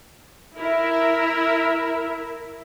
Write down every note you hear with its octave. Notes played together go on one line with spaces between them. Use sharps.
E4 A#4 E5